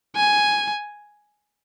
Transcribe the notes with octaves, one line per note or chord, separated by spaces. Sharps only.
G#5